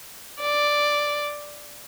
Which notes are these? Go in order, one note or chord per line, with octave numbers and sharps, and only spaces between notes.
D5